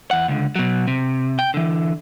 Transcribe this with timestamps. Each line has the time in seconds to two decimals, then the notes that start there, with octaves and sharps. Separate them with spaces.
0.11 E2 F#5
0.28 C#2 D3
0.55 B2 F#3
0.87 C3
1.39 G5
1.54 D3 E3